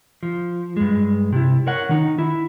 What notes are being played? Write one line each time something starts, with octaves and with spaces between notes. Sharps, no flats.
F3
G2 G#3
C3 E4
A#4 C#5 F#5
D#3 D#4
E4